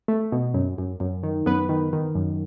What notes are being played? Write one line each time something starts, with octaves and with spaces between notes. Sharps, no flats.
A3
B2
F#2
F#2
F#2
D#3
F#2 B3 B4
D#3
D#3
F#2